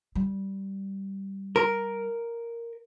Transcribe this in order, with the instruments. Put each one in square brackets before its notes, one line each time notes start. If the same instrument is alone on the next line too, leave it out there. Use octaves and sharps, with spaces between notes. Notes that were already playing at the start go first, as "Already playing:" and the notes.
[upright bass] G3
[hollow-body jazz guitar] A#4